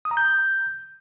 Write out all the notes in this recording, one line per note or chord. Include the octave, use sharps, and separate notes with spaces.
D#6
A#5
G6